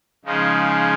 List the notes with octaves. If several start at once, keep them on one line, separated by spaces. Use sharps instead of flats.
C#3 F3 G#3 D#4